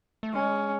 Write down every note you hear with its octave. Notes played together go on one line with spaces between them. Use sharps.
A3
G#3 C#4